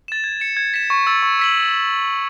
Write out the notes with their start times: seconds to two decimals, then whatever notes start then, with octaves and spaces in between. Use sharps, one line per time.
0.08 A6 E7
0.24 G#6
0.40 C#7 E7
0.57 G#6
0.74 B6 E7
0.90 C#6
1.07 E6 A6
1.23 C#6
1.39 E6 B6 F#7